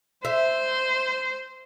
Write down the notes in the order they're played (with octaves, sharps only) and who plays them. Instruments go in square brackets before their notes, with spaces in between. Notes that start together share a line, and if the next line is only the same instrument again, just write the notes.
[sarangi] C5 [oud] E5